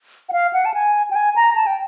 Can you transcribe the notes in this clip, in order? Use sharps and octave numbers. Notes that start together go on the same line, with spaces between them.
F#5
F5
F#5
A5
G#5
G5
G#5
A#5
A5
G5